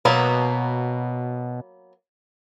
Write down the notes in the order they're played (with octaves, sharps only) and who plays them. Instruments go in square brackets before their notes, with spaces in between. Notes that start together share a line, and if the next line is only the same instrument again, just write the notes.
[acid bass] B2 [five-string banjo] F#3 A#3 B3